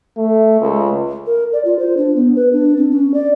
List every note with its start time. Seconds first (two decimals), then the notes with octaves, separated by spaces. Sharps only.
0.17 A3
0.61 C#2
1.26 A#4
1.53 D5
1.65 F4
1.79 C5
1.97 D4
2.16 B3
2.36 B4
2.53 D4
2.77 C4
2.91 C#4
3.14 D5